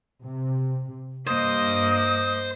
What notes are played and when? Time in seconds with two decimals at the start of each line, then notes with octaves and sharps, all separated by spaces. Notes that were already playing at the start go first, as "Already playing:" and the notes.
0.23 C3
1.27 G2 A#3 C5 D#5 D#6